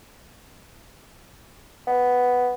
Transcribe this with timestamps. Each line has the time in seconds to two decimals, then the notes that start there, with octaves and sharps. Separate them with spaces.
1.87 B3